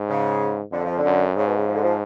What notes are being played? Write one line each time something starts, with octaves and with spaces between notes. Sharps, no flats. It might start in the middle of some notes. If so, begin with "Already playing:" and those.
Already playing: G#2
C#3
F2 D3
F3
D3
F#2
G#2 C#3
B2
C#3
F3
D3
F3